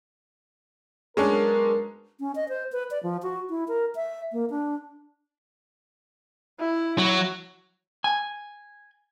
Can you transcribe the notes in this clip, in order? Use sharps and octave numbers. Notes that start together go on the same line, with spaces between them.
F#3 G#3 B3 C#4 D4 A#4
C#4
D#5
C5
B4
D5
F3
F#4
E4
A#4
E5
A#3
D4
E4
F#3
G#5